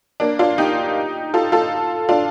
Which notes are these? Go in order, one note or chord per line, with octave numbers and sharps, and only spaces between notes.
A#3 D4
D4 F4
D#4 G4
F4 A4
F4 A4
D4 F4